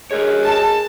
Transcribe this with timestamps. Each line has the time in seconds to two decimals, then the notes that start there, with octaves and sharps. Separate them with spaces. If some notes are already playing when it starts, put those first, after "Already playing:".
0.11 G#3 A#4 C#5
0.43 A5